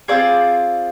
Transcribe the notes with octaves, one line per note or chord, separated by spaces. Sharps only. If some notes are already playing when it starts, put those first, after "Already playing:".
C4 F4 G#4 D5